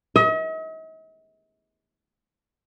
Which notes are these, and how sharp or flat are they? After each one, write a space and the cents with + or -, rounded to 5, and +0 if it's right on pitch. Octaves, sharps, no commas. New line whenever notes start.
D#5 +45